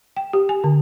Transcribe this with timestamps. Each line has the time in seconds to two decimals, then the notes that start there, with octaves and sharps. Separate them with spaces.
0.17 G5
0.33 G4
0.49 G#5
0.64 D3